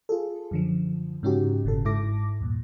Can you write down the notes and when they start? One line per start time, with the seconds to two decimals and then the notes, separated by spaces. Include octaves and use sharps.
0.09 F4 G#4 A4
0.51 F#2 D3 F3
1.23 G#2 C#3 C#4 D#4 F#4 G4
1.64 G1 A#2 C#3 A4
1.85 G#2 E4 A4 D6 A#6
2.41 E2 G2 A#2